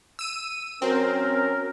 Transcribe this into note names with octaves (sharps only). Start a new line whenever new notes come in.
E6 D#7
F#3 C4 C#4 A#4